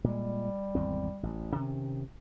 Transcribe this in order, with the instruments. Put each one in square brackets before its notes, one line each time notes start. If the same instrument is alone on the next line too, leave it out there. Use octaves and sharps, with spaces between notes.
[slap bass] A#2 G#3 [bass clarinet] G3
[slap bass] G#1 E2 C4
A1
C3 D#3 C#4